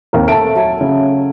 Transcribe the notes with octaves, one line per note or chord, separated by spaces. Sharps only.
D#2 C4 A#4
A3 A5 D7
F#3 A3 G#5
C#3